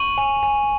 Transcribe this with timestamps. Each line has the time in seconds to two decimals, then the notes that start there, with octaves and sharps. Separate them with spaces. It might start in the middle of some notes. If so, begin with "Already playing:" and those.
Already playing: C#6 D#7 F#7
0.18 G#5
0.43 G#5